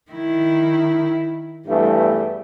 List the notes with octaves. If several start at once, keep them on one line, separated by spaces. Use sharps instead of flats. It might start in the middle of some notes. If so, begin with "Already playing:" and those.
D#3 E4
E2 G2 G3 A3